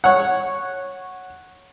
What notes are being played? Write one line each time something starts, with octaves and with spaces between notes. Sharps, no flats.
C#5 F#5